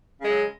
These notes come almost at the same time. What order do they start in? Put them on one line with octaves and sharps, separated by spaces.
C#3 G#3 F#3